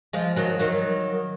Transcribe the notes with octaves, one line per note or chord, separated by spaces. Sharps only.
F3 G#3
D#3 F#3
D#3 F#3